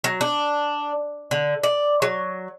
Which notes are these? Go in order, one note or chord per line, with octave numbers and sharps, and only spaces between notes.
F#3
D4
D3
D5
F#3